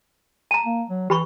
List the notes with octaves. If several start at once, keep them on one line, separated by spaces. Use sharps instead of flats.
A5 A#5
A#3
F#3
E3 G4 B5 C#6